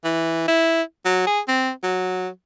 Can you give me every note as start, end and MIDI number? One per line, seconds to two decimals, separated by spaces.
0.04 0.43 52
0.48 0.82 64
1.05 1.23 54
1.26 1.40 68
1.48 1.71 60
1.83 2.29 54